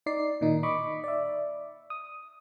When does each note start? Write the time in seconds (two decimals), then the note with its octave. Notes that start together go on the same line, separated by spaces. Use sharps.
0.06 D#4 D5 C7
0.41 A#2 D#3 D#4
0.63 D#5 B5 C#6 D6
1.04 D5 E5
1.90 D#6